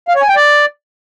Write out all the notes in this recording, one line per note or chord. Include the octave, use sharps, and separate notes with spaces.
F5
C#5
G#5
G5
D5